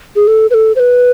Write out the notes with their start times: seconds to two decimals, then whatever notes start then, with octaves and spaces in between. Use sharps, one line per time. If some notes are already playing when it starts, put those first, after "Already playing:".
0.16 G#4
0.27 A4
0.50 B4
0.54 A4
0.76 C5
0.80 B4